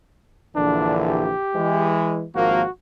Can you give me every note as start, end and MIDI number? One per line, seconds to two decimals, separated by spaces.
0.56 1.32 34
0.56 1.32 50
0.56 1.32 52
0.56 0.98 62
1.09 1.96 67
1.54 2.24 52
1.54 2.24 56
2.35 2.62 32
2.35 2.62 53
2.35 2.62 58
2.35 2.70 66